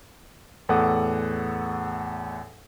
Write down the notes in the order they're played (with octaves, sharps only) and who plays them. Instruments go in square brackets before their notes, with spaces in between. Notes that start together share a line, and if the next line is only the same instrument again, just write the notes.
[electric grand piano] E2 A2 A4 F#5 D6 D#6